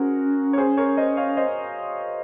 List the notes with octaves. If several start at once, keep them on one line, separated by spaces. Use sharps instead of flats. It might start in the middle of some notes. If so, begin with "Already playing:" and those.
Already playing: C#4 F#4 G#4 A#4 C5
C#5
G#4 C5
A#4 C#5
C5 D#5
C#5 F5
C5 D#5